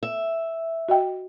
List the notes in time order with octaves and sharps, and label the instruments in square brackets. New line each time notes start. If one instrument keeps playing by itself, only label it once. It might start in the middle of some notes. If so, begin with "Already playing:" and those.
[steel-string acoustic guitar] E5
[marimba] F#4 D#5 G5